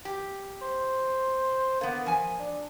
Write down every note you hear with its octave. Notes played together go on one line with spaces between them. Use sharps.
G4
C5
D3 A#3 B3
F3 G#5
D4